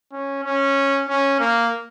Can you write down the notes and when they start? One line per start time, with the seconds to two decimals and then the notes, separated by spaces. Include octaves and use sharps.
0.12 C#4
0.44 C#4
1.08 C#4
1.40 A#3